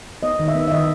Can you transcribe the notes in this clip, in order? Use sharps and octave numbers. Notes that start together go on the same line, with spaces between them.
B3 D#5
D#3
E5
B3
E5
D#3 D#5